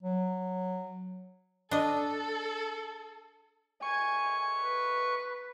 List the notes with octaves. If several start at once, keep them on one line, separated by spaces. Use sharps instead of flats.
F#3
D4 A4 D#5
G#5 C#6
B4